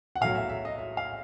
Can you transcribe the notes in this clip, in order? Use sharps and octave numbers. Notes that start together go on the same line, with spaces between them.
F#5
B1 A2 F#3 F5
E5
E5
D#5
E5
F5